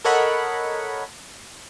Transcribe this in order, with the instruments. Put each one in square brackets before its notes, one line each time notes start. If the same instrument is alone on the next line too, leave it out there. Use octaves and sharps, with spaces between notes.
[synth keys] A4 A#4 C#5 D#5 F#5 B5